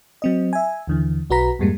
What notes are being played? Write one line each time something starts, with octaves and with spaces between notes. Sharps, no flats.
F#3 C4 D#5
E5 G#5
D#2 D3 E3
B1 F#4 B4 A#5 B6
F2 G#2 G3 G#3 A#3